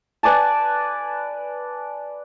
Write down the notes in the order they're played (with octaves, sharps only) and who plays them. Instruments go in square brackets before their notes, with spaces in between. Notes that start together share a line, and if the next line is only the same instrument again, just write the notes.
[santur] B4 D5 G#5 A5